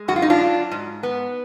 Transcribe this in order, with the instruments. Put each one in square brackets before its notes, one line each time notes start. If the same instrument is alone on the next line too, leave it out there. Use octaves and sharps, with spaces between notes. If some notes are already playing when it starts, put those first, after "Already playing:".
Already playing: [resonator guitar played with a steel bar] G#3
F#2 F#4
F4
D#4
D4 F4
F#3
G#2
B3